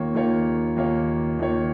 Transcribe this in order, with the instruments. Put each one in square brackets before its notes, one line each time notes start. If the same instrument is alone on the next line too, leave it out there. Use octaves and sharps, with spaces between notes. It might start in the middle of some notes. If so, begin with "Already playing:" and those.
Already playing: [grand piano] D#2 D#3 A#3 F4 C#5
D#2 D#3 A#3 F4 C#5
D#2 D#3 A#3 F4 C#5
D#2 D#3 A#3 F4 C#5